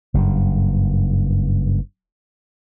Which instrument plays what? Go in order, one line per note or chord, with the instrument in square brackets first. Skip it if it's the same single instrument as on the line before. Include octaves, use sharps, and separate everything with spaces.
[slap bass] F#1 G2